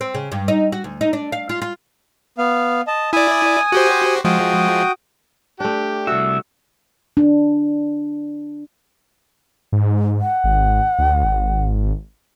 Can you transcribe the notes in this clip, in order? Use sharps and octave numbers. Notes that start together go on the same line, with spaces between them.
C4
C#3
G2
D#4
F#4
D2
D#4
D4
F5
F4
F4
B3 F5
D#5 A5
E4 D5 G#5 D#6
F#4 G4 C5
F3 G#3 F#4 G5 D#6
A3 D4 G4
C2 F#4 E5
D4
G#2
F#5
G#1
D2
G#1